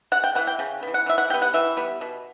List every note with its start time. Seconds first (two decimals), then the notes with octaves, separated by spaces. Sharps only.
0.12 C#3 F#5
0.24 G5
0.35 E3 B3 F#5
0.47 G5
0.59 C#3
0.83 E3 B3
0.94 F#5
1.06 E3 E5
1.18 F#5
1.30 G3 G5
1.34 B3
1.42 F#5
1.54 E3 E5
1.77 G3 B3
2.01 B2